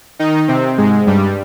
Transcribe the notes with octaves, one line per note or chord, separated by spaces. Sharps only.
D#3 D#4
C3 C4
G#2 G#3
G2 G3